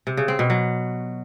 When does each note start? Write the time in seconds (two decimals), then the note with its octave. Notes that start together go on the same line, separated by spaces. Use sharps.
0.07 C3
0.17 C#3
0.28 C4
0.39 B2
0.50 F#3